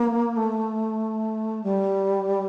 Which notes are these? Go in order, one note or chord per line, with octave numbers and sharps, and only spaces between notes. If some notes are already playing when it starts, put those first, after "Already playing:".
Already playing: A#3
A3
G3